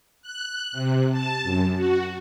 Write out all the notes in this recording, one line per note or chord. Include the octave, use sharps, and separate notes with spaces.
F#6
C3
A5
F#2
F#4